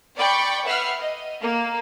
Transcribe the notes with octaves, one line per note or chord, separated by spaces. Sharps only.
D5 G5 B5 C#6 A6
B4 E5 F#5 F6 C7
D#5
A#3